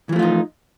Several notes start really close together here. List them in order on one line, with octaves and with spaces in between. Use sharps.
E3 F3 A3 F4 D#4